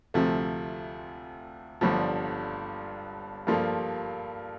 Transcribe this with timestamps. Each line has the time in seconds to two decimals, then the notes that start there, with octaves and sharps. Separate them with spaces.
0.14 D2 C3 F3 A3
1.81 G1 G2 D3 F3
3.47 G2 F3 A#3 F4 A4